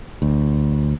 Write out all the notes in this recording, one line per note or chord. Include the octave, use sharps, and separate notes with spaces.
D2